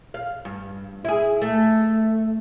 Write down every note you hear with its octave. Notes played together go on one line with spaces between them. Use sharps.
F5
G2
E4 G#4
A3